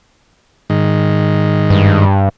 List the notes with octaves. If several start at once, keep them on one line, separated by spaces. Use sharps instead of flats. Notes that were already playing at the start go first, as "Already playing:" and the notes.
G#2 D#3
G2